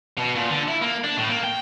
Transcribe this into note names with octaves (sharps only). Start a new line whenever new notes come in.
B2
A#2
D3
E4
A#3
D4
A2
A#3
G5